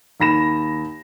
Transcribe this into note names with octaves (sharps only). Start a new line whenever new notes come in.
D#2 B5 A#6 E7